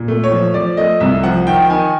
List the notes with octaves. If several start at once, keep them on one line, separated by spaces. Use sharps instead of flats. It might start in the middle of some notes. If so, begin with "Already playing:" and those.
Already playing: A#2
A3
C#5
F3
F3 D5
A3 D#5
C2 E5
F3 F#5
D#3 G5
D#3 G#5